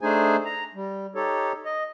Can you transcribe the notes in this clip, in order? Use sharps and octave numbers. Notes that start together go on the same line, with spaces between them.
A3 D4 D#4 G#4 C5 G#5
A#5
G3
D#4 G4 A4 C#5
D#5